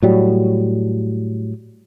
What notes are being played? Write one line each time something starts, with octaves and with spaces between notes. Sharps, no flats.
A2 F#3 G3